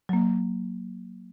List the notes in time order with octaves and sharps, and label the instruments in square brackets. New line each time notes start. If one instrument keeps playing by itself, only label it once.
[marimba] F#3 A#3